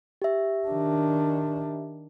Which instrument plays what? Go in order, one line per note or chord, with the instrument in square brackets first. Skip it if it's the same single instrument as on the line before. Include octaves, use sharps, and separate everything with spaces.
[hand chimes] G4 E5
[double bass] D#3 D4